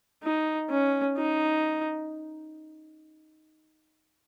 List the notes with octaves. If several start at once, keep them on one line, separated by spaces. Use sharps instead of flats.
D#4
C#4
D#4